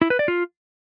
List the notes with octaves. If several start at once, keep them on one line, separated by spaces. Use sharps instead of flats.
E4
B4
D5
F4